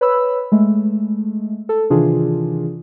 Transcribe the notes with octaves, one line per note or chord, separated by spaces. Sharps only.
B4 C#5 B5 E6
G#3 A3
A4
C3 D#3 E3 D4 F4 G#4